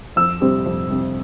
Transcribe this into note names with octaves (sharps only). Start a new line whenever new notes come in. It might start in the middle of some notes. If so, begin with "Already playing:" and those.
F2 E6
C3 G3 C4
F2
C3 G3 C4